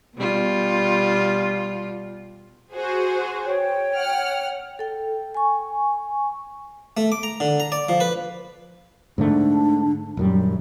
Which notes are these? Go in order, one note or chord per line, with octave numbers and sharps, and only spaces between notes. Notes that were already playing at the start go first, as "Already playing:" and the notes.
B2 G3 F4
F#4 G#4 C5
C#5 G5
F#5 F6
A4 G5
G#5 C#6
A3
D6
A#5
D3
A#5
D5
F3
B4
G#2 D3 A3 D4
D#1 F#2 F#3 G3